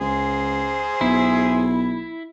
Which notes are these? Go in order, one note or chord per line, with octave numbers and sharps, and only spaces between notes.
C#2 G#4 C5
B1 E4